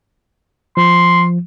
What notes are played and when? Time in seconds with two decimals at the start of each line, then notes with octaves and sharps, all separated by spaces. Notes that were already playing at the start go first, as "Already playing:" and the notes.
0.77 F3 C6